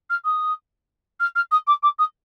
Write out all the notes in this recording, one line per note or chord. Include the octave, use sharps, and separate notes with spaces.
F6
D#6
F6
F6
D#6
D6
D6
D#6